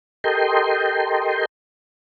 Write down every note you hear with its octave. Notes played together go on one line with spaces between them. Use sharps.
G4 A4 A#4 D#5 G5 C6